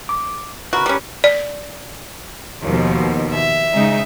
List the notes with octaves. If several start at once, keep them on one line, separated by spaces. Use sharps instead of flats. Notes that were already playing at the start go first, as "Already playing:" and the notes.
D6
C#3 F#4 A#4 B4 B5 F#6
G3 C#4 B5
D5
D#2 B2 F3
E5
C#3 G#3 D#4